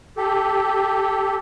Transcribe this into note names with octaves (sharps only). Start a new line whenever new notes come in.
G4 A4